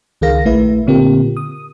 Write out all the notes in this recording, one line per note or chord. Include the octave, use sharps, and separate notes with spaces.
C#2 D#3 G#4 A#4 F5 A#6
A#1 A3 E4 B4 E5
A#2 D3 C4 F4 G4 A#4
D#6